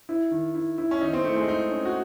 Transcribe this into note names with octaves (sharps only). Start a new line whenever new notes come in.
E4
D#3
E4
E4
C#4
D#3 D#4
C4
A3 E4
G#3
D#4 E4
C#4
F#4